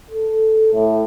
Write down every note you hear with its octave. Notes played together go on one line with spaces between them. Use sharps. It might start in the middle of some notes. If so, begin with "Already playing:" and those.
A4
A2